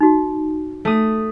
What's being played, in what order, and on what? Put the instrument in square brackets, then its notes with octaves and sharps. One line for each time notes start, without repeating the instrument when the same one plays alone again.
[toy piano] D#4 F#4
[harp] A3 D#6